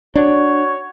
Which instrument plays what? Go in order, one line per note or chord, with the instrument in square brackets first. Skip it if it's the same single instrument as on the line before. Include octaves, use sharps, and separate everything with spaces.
[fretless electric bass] D4 [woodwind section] F#4 C#5